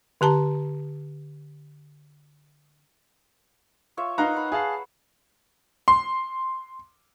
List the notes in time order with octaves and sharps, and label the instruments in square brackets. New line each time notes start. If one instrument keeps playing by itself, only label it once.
[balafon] D3 G4 A5 A#5
[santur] F4 C#5 E5
[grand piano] D#4 F5 A#5 [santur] A#4 B4 F#5
[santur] B5
[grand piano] G#4 F5 A5
C6